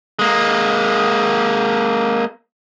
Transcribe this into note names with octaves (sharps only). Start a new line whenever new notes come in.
G#3 A#3